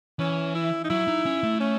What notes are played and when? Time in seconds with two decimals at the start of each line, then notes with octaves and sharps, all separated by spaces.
0.19 E3 C#4
0.55 E4
0.84 D#4
0.90 F#3 E4
1.08 D#4
1.26 C#4
1.43 A3
1.60 C#4